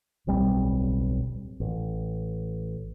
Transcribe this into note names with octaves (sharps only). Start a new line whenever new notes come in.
D1 B1 G3 C4
A1